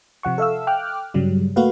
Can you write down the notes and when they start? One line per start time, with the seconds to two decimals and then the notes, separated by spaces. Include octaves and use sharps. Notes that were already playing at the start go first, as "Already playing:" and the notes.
0.23 C3 F3 F#5 C#6
0.38 A4 E5 F5 E6
0.67 G5 D6 F6 F#6
1.14 G2 C#3 F#3 G3
1.56 A3 A#3 F#4 B4 F5